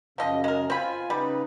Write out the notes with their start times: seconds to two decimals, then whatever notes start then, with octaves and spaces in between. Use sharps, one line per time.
0.18 F#2 C#3 F3 D#5
0.44 G#3 A#4
0.70 C4 F4 G#5 B5
1.10 C#3 G3 D#4 B4